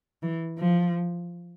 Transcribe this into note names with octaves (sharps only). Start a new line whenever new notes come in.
E3
F3